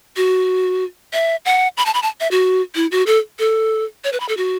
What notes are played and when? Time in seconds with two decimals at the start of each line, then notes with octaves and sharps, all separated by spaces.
0.16 F#4
1.13 E5
1.45 F#5
1.77 B5
1.86 A5
1.94 B5
2.03 A5
2.20 E5
2.31 F#4
2.75 E4
2.92 F#4
3.07 A4
3.39 A4
4.04 C#5
4.13 B4
4.20 B5
4.29 A4
4.37 F#4